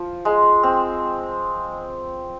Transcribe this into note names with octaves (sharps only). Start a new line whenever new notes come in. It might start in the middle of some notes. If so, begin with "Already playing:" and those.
Already playing: F3
G#3
C4